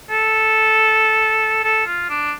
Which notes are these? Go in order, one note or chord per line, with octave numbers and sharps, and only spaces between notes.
A4
A4
F4
D4